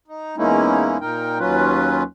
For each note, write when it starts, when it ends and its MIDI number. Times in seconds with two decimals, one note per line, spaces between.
0.08 0.36 63
0.37 0.97 40
0.37 0.97 56
0.37 0.97 58
0.37 0.97 61
0.37 0.97 63
0.37 0.97 64
1.01 1.38 46
1.01 1.38 63
1.01 1.38 70
1.01 1.38 79
1.39 2.03 39
1.39 2.03 54
1.39 2.03 61
1.39 2.03 65
1.39 2.03 71